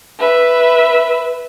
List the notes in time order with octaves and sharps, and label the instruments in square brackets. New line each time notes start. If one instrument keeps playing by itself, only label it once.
[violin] B4 E5